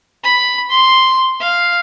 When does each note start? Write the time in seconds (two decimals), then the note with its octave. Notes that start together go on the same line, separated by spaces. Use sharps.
0.24 B5
0.71 C6
1.40 F5